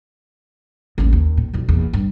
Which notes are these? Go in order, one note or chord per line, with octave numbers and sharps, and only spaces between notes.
A1 D#2
D#2
A#2
B1 F2
E2 A#2
G2